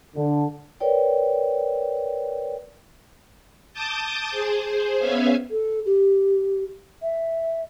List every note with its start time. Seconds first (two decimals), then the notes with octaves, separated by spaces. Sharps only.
0.16 D3
0.80 A#4 B4 C#5 D5 G5
3.73 A5 D6 D#6 G6 A6
4.31 G#4 C5
4.65 G#4 C5
4.99 B3 C#4 E5 F5 G#5
5.51 A4
5.86 G4
7.02 E5